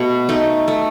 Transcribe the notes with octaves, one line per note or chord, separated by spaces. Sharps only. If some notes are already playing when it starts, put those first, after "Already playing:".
Already playing: B2 A3
A3 D#4
A3